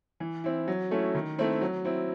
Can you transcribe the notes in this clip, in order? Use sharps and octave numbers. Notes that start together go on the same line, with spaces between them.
E3
C4 E4
F#3
A3 C#4 E4
D#3
A3 C4 E4
F#3
C4 E4